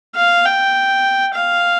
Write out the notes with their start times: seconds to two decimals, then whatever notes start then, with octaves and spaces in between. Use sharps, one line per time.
0.15 F5
0.45 G5
1.33 F5